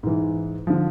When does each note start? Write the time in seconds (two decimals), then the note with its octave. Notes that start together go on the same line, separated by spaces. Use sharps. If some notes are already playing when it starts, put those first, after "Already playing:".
0.03 G#2 E3
0.67 D3 F3